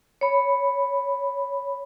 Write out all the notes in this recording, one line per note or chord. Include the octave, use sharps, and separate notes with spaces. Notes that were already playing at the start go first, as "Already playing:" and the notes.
C#5 B5